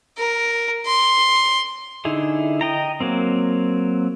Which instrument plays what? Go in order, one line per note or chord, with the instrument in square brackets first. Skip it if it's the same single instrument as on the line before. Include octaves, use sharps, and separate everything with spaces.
[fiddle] A#4
C6
[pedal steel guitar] D3 D#4 E4 G#4
D#5 G5 A#5
F#3 A#3 C4